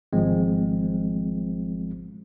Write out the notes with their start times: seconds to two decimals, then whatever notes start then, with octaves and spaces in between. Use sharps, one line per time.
0.13 G#1 F3 G#3 C4